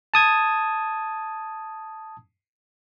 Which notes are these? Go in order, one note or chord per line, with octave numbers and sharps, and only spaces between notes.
A5 D#6 G#6